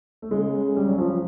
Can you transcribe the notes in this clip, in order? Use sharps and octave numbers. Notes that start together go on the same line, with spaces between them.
A3
C#3 G#3
G3
F#3
F3
F3